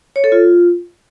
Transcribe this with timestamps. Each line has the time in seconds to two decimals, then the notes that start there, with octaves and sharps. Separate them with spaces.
0.16 C#5
0.24 A4
0.32 F4